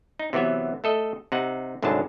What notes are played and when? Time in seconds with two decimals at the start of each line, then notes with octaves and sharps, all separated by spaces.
0.19 D#4
0.33 C3 E3 F#3 B3 E5
0.84 A3 A4 D#5
1.32 C3 D#4 F#5
1.82 C2 G#2 D3 D#3 F#3 A5